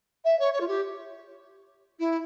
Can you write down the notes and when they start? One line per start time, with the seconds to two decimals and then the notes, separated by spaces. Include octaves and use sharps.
0.24 E5
0.39 C#5
0.53 C#5
0.60 F4
0.67 G4
1.99 E4